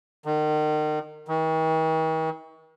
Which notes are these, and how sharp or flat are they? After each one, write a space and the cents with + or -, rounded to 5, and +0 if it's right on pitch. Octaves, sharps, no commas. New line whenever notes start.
D#3 -35
D#3 +45